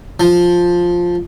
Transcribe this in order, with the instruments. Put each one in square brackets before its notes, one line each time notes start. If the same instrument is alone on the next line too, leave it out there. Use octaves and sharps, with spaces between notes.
[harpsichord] F3